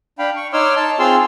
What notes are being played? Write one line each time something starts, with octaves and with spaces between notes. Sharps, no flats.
D4 F5 G5 B5
C#6
D#4 C#5 C6 D6 E6 F6
A5
C4 F4 G#4 F5 C6 E6